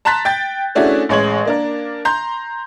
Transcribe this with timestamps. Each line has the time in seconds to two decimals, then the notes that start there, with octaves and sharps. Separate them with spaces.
0.05 A5 A#5 C6 F#6 A6 B6
0.25 G5 G6 A6
0.75 A3 C#4 D4 E4 F#4 G#4
1.09 A1 G#3 C#5 G#6 F#7
1.45 A#3 D4 A#4
2.05 A#5 C6 G6